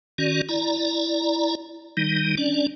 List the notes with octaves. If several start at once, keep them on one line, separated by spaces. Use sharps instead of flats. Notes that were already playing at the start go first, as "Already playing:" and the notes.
D#3 C#4 F#4 D5
E4 D5 A#5
D#3 G3 D#4
C#4 D4 D5